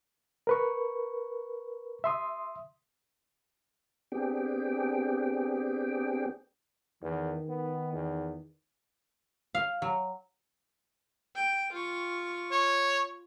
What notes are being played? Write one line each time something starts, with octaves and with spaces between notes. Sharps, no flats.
A#4 B4 C#6
E5 C6 D#6
B3 C4 D4 G4 G#4 G5
E2 D#3
B3
E2
F5
F#3
G5
F4 C#6
C#5